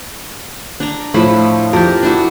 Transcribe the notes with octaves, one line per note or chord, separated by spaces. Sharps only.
D4 A#5
A2 F3 E4 B5
F2 G4 A#4
D4 E4 F#4